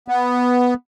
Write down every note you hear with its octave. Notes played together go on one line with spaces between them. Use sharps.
B3